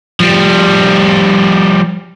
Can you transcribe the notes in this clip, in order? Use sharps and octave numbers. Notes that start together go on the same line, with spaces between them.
F3 G3